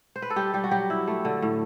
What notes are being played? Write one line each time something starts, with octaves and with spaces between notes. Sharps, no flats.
C5
B4
A4
G3 G4
G3 G4
F#4
F#3 G4
E4
A3
D3
A2